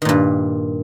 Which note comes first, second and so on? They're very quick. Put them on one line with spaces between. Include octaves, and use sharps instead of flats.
D#3 A#2 G2